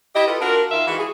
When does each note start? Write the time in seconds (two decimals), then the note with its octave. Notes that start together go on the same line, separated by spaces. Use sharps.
0.15 E4 G4 D#5
0.27 F4 A4 B4 D#5
0.41 D4 F4 F#4 A#4
0.71 D#3 F4 E5 F5
0.87 E3 G#3 F#4
0.99 G#4